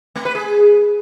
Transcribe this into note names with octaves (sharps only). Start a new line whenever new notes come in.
A3
B4
G#4